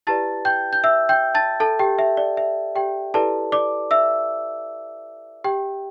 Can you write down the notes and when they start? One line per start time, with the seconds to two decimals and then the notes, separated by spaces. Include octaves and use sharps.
0.07 E4 G4 B4 D5 A5 A6
0.45 G5 G6
0.73 G6
0.84 E5 E6
1.09 G5 G6
1.35 A5 A6
1.60 A4 A5
1.79 G4 G5
1.99 E5
2.17 D5
2.37 E5
2.76 G4 G5
3.14 E4 G4 A4 B4 D5 A5
3.52 D5 D6
3.91 E5 E6
5.44 G4 G5